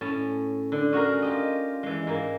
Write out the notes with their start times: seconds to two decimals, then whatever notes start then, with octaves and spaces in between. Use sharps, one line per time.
0.01 A2 C#4 A5
0.72 D3
0.93 C#4 F#4 G#4 A#4
1.22 F4 G4 D#5
1.83 E3 G#3
2.07 G#2 A#3